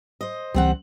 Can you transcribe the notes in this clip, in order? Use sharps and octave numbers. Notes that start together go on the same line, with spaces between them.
C5 D#5
C#2 E3 G3 C4 F#5